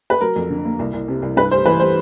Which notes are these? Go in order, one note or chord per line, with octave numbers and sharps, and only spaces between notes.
B4
F#3 A#4
F2
D3
A#3
C2
C2
C3
C2
G2 B4
G3 C5
E3 B4
G3 C5